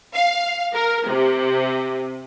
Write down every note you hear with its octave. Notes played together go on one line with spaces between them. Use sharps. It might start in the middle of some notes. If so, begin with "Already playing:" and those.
F5
A#4
C3